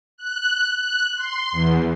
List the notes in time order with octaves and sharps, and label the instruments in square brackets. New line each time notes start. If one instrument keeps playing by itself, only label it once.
[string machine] F#6
F#6
C6
E2